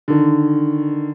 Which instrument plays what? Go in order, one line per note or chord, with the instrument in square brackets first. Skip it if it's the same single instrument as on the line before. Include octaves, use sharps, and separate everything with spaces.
[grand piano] D3 D#3